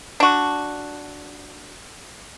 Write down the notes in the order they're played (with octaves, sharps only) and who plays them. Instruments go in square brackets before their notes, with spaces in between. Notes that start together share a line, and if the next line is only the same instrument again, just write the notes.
[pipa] D4 F#4